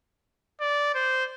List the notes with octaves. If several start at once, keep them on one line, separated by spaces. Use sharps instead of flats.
D5
C5